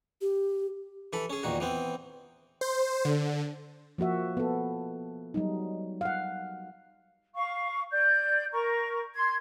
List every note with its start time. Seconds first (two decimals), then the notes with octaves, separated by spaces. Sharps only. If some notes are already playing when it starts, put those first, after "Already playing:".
0.21 G4
1.13 E3 A4 B5
1.30 C#4 G#4
1.43 E2 A#2 D#3 F#4
1.60 E3 B3 C4
2.61 C5
3.05 D3
3.98 F3 A#3 F#4 E5
4.37 B3 A4
5.34 F#3 G3 D#4
6.01 F5 F#5
7.35 F5 C#6
7.92 D5 G6
8.52 A#4 A#5 C#6
9.14 C6 G#6